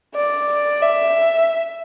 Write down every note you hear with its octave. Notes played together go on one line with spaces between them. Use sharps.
D5
E5